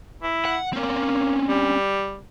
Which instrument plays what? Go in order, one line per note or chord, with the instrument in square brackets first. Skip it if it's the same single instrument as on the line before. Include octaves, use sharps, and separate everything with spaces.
[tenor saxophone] E4
[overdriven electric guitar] F#5
[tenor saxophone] A#3 [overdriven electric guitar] C4 C#4
[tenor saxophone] G3